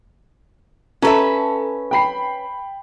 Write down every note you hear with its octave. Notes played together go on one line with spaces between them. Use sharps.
C#4 A4 B4 E5 A5 A#5
G5 B5 C7